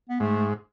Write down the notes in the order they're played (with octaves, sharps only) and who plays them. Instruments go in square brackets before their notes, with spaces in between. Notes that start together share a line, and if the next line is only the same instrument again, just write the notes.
[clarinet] B3
[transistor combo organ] G#2 [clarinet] A3